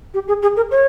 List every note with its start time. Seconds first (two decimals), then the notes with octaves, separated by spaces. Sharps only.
0.14 G4
0.28 G#4
0.42 G#4
0.56 A#4
0.71 C#5